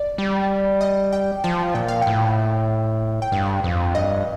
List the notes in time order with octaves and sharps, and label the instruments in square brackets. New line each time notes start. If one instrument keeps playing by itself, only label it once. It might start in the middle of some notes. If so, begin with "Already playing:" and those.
Already playing: [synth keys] D5
[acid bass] G3
[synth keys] D#5
G5
[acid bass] F3 [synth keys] A5
[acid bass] A#2 [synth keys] G5
[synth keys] F5
G5
[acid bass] A2
[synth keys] G5
[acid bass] G2 [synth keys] F5
[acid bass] F2
[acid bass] G2 [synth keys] D#5